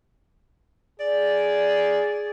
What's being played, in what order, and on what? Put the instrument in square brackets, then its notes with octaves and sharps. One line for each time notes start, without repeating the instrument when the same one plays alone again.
[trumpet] G#4 [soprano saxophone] D5